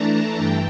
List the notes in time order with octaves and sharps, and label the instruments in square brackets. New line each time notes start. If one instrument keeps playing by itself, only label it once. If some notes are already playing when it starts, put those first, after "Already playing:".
Already playing: [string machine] E3 A3 D4 A5 A#5
G2 E3 G5